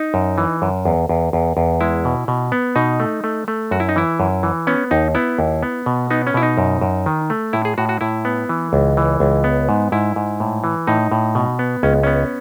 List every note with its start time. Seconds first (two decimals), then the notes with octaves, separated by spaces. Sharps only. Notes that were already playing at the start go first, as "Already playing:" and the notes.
Already playing: D#4
0.14 F#2
0.38 E3
0.62 F#2
0.85 E2
1.09 E2
1.33 E2
1.57 E2
1.81 G#3 E4
2.05 B2
2.28 B2
2.52 B3
2.76 B2 D#4
3.00 A3
3.24 A3
3.48 A3
3.71 F#2 F#4
3.80 E4
3.89 D#4
3.96 E3 E4
4.20 F#2
4.43 E3
4.67 B3 C#4
4.91 D#2 D#4
5.15 B3 E4
5.39 D#2
5.63 B3
5.86 B2
6.11 B3 D#4
6.27 C#4
6.34 B2 E4
6.43 D#4
6.58 F#2
6.81 F#2
7.06 D#3
7.30 A3
7.53 A2 E4
7.65 G#4
7.78 A2 F#4
7.89 F#4
8.01 A2 E4
8.25 B3
8.49 E3
8.73 C#2
8.97 E3
9.20 C#2
9.44 B3
9.69 G#2
9.92 G#2 E4
10.16 G#2
10.40 A2
10.64 E3
10.87 A2 D#4
11.12 A2
11.35 B2
11.59 B3
11.83 C#2 C#4
12.03 B3 C#4